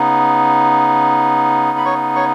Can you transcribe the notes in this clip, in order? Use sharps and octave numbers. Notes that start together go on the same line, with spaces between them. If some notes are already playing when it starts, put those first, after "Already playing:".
Already playing: C#3 B3 D#4
B5
C#5 C#6
C#5 C#6